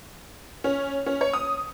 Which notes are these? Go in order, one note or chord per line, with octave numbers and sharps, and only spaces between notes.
C#4
C#4
C#5
D#6